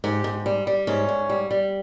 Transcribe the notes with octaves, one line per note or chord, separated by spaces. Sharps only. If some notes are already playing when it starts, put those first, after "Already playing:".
G#2 G4
G#2
G3
G3
G#2 C#4
G#2
G3
G3